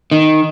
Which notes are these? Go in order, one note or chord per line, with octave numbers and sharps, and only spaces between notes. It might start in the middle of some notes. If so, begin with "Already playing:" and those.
D#3